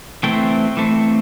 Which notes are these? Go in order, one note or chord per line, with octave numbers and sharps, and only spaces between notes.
E3 A3 C4 G5
E3 A3 C4